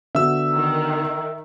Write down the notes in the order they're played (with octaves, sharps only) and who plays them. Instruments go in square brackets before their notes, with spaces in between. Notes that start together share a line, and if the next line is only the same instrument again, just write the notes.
[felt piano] D3 B3 F#4 [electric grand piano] E5 E6
[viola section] D#3